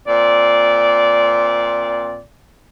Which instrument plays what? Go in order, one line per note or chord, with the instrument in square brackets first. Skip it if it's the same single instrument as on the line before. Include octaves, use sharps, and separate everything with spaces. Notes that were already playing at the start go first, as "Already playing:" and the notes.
[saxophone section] A#2 C4 D5